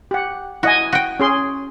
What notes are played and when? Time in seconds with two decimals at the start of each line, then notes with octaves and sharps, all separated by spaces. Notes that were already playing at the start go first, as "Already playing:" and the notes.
0.11 G4 F#5
0.63 E4 F#4 D#5 G#5
0.92 F#4 G5
1.20 C#4 G#4 C6